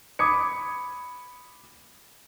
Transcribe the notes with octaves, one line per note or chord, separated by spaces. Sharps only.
B5 D6 D#6 G#6 C#7